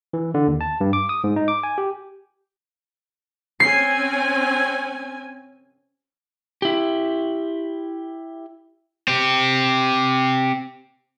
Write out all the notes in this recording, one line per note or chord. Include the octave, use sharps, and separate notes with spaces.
E3
D3
D#2
A5
G2
D6
D#6
G#2
D#4
D6
G#5
G4
C4 C#4 G#5 C7
E4 G4
C4 G4